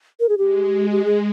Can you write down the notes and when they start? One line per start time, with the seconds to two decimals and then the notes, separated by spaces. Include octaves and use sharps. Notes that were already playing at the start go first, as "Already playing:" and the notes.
0.20 A#4
0.29 G#4
0.38 G#3 G4
0.91 G#3 G4
1.05 G#4